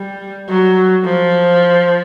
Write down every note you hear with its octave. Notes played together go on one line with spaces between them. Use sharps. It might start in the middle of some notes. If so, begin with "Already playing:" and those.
Already playing: G3
F#3
F3